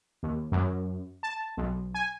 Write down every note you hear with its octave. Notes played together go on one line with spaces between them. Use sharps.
D#2
F#2
A5
B1
G#5